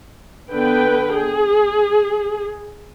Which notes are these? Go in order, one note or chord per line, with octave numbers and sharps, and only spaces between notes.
D3 B3 B4 G5
G#4